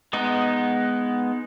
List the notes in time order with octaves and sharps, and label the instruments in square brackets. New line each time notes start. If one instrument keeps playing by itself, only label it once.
[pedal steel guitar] G#3 B3 D#4